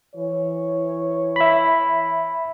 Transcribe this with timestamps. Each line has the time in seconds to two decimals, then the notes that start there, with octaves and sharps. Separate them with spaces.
0.15 E3 C#5
1.36 E5 B5